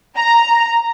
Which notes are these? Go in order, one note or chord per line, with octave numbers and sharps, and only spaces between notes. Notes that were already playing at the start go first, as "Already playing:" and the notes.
A#5